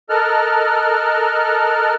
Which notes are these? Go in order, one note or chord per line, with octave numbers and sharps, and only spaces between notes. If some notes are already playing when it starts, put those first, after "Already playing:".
A4 A#4 D#5 A5 F6 F#6